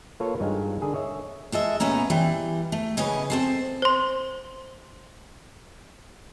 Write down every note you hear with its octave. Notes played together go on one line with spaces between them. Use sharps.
A#3 F4 A4 B4 C#5
G2 G#3 D#4 F4 F5 G#5
D3 G#4 A#4
C#5 D#5 E5
G#3 A4 D#5 E5
A#2 A3 B3 C#4 A#5
E3 G3
A3
G#2 C#3 C#4 B4 D#5 G#5
C4 A4 C5
C5 C6